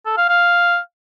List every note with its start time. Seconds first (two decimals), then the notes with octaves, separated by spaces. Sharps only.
0.06 A4
0.18 F5
0.29 F5